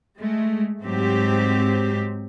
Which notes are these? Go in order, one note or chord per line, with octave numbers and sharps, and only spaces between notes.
G#3 A3
G#2 F#3 C4 G4